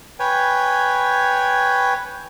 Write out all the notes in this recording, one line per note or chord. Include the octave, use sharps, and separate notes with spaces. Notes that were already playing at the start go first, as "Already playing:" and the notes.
B4 C#5 G5 G#5